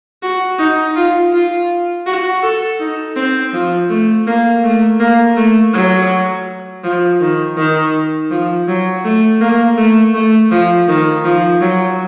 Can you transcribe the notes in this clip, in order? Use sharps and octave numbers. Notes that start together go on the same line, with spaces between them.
F#4
D#4
F4
F4
F#4
A4
D#4
C4
F3
A3
A#3
A3
A#3
A3
F#3
F3
D#3
D#3
F3
F#3
A3
A#3
A3
A3
F3
D#3
F3
F#3